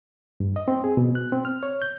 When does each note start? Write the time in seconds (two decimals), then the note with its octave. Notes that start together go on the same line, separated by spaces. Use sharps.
0.40 G2
0.56 D#5
0.68 C4
0.84 G#4
0.97 B2
1.15 F#6
1.32 C4
1.45 F6
1.63 C#5
1.82 G6